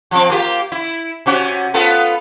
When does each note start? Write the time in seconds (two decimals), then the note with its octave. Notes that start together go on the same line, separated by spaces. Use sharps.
0.11 F3 C4
0.30 A#3 F4 G4
0.72 E4
1.26 C3 C#4 F#4
1.74 B3 F4 A4